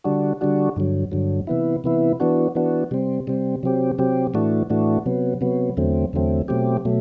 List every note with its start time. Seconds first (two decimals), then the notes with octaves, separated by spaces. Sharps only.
0.04 D3 G3 D4 F#4
0.41 D3 G3 D4 F#4
0.76 G2 D3 F#3
1.12 G2 D3 F#3
1.47 C3 E3 B3 E4
1.84 C3 E3 B3 E4
2.20 E3 B3 D4 F#4
2.55 E3 B3 D4 F#4
2.91 C3 G3 C4
3.27 C3 G3 C4
3.63 C3 F#3 C4 G4
3.98 C3 F#3 C4 G4
4.34 A2 E3 A3 D4 F#4
4.70 A2 E3 A3 D4 F#4
5.06 C3 F#3 B3
5.41 C3 F#3 B3
5.77 E2 D3 F#3 A3 C4
6.13 E2 D3 F#3 A3 C4
6.48 B2 F#3 A3 C4 G4
6.85 B2 F#3 A3